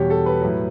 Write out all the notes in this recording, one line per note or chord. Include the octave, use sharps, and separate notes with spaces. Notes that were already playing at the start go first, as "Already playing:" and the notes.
Already playing: E2 B2 G3 G4 C#5
A4
B4
A2 F#3